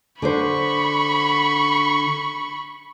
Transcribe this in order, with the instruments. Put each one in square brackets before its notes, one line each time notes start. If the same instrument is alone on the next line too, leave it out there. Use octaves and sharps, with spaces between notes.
[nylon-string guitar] D3 D4 C5 [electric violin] B5 C#6